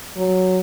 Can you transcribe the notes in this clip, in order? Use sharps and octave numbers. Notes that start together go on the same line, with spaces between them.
F#3